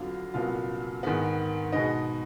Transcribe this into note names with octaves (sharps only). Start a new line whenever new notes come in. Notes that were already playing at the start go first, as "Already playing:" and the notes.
Already playing: F2 D3 F#3 B3 F4 F5
C2 A#2 F#3 B3 F4 F5
G#2 D#3 G#3 B3
B2 G#3 B3 D#4 D#5